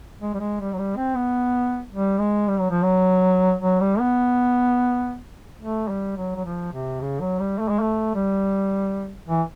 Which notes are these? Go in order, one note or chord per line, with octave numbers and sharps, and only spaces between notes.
G#3
G3
G#3
G3
F#3
G3
C4
B3
G3
G#3
G3
F#3
F3
F#3
F#3
G3
B3
A3
G3
F#3
F#3
F3
C3
C#3
F#3
G3
A3
G#3
A3
G3
E3